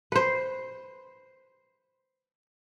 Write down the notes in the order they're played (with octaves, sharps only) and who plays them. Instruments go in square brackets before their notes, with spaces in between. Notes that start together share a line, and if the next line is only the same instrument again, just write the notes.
[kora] B4 C5